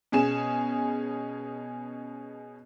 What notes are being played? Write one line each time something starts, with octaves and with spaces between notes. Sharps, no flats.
B2 C#4 G#4 E7